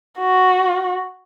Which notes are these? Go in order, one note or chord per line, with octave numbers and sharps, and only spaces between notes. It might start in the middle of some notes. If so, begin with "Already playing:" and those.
F#4